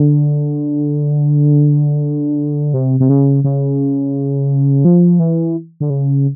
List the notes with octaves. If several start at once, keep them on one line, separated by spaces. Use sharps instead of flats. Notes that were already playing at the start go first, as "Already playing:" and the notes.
Already playing: D3
C3
C3
C#3
C#3
F3
E3
D3
C#3